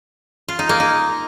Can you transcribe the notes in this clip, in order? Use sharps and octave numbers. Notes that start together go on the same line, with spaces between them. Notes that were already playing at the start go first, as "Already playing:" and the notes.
F4
D#4
A#3
D#4